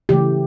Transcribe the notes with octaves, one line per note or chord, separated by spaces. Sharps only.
C#3 E3 A3 G4